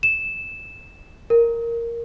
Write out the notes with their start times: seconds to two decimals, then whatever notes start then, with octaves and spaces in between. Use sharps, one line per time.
0.03 E7
1.30 A#4